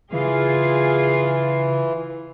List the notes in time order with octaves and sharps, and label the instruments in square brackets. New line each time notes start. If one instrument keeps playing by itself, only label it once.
[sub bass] C#3 [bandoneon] E3 [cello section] F4 G#4 F5